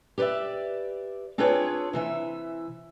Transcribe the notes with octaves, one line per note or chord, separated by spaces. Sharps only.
G4 B4 C5 D5 E5
C4 D4 F4 G#4 B4 C#5
C3 E3 E5